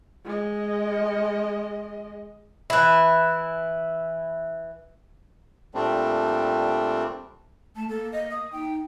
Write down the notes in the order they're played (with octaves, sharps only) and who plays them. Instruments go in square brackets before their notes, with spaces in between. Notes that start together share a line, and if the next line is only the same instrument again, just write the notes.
[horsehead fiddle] G#3 D#5
[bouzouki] E3 E4
[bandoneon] A#2 G3 A3 C4 D4
[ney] A3 [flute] A5
[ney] A#3 [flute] A4
[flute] D#5
D#6
[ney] D#4 [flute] G5